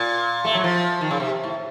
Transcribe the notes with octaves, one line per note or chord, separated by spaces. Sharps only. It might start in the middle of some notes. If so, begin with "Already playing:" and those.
Already playing: A#2
A3
F#3
F3
D#3
C#3
C3
A2